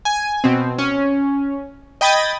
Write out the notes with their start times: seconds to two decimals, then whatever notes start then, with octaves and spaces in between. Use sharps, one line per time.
0.05 G#5
0.44 B2 C4
0.79 C#4
2.01 D#5 G5 B5 D#6 G#6 A6